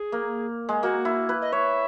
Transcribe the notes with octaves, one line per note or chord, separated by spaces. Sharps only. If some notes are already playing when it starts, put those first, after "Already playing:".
Already playing: G#4
A#3
G#3
A#3 F#4
E4
B4
D#5
C#5 E5